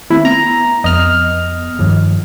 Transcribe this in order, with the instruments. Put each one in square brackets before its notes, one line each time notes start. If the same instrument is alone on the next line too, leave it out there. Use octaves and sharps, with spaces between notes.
[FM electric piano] D#3 A3 C4 [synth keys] E4
[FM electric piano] B3 [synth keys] A#5
[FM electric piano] F2 B3 [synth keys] D#5 F6
[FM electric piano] G2 D#3 F3